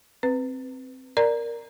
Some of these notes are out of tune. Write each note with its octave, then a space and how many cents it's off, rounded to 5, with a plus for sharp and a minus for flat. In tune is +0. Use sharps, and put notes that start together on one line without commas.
C4 +0 B4 +10
A#4 +0 D5 +0 A#5 +0